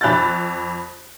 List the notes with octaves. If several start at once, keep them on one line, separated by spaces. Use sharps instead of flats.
F2 B5 F#6 G6 A6